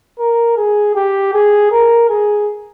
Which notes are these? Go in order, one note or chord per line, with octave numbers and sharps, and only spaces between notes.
A#4
G#4
G4
G#4
A#4
G#4